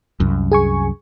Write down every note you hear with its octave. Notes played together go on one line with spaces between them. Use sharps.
C2 F#2
G#4 G#5 C#6